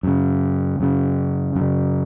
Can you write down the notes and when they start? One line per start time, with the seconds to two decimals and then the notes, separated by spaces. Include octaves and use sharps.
0.03 F#2 C#3
0.80 F#2 C#3
1.55 F#2
1.61 C#3